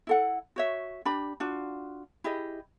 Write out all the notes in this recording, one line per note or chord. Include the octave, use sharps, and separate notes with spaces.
E4 A4 F#5
F#4 C#5 E5
D4 G4 B5
D4 F4 F#4
E4 G4 G#4 D#5